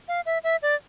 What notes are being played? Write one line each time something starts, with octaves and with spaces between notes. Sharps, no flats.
F5
E5
E5
D5